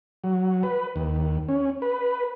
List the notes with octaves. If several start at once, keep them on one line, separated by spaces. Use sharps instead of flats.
F#3
B4
D#2
C#4
B4